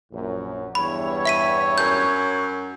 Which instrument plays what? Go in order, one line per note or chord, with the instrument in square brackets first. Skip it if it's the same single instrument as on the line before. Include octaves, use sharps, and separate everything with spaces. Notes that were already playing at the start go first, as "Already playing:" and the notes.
[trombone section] A#1 F#2
[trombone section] E2 G2 [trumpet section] E4 C#5 [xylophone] B5
[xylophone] E5 B6 D#7
[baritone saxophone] F#2 [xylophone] G6